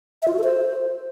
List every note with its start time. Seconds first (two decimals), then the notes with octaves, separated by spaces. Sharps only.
0.22 E5
0.28 F4
0.33 F#4
0.38 A4
0.44 C5